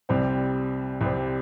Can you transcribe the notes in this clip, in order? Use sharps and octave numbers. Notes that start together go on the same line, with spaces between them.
C2 C3 G3 C4
C2 C3 G3 C4